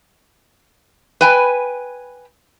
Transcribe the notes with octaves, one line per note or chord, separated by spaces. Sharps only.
B4 G5 G#5